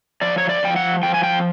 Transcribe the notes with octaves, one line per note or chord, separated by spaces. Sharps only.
F3 D5
C#5
D5
F3 G5
F#5
F3 G5
G#5
G5